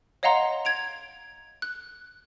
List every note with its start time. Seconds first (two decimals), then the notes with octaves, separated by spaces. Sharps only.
0.23 C#5 D#5 F5 F#5 A#5 C6
0.65 G#6 D7 F7
1.62 F#6